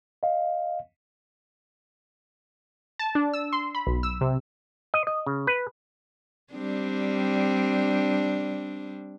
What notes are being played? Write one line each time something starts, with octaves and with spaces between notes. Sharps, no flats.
D#5 F5
A5
D4
E6
C6
B5
B1
E6
C3
D#5
D#5
C#3
B4
G3 C4 D4